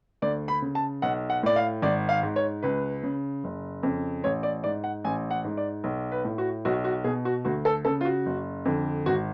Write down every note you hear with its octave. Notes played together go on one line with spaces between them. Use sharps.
D2 D5
B5
C#3
A5
B1 F#5
F#5
A2 D5
F5
G#1 D5
F5
G#2
C#5
C#2 B4
C#3
F#1
F2 C#3
A1 C#5
D5
G#2 D5
F#5
A1 G#5
F#5
G#2
D5
B1
B4
A2
F#4
B1 F#4
F#4
B2 G#4
F#4
D2 F#4
A4
C#3 A4
F4
F#4
F#1
F2 D3
G#1 F#4